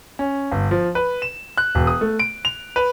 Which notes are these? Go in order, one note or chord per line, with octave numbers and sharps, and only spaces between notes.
C#4
G1
F3
B4
E7
F#6
E1
D#6
A3
D7
F7
B4